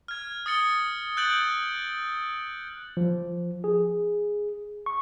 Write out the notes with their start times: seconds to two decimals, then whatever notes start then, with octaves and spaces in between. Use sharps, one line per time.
0.08 F6 G#6
0.46 D#6 A6 C#7 G7
1.17 E6 F#6 G6 A6 D7 F#7
2.97 F3
3.64 G#4
4.86 C#6